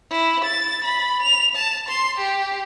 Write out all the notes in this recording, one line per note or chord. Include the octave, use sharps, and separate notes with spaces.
E4
A6
B5
F7
A5
C6
G4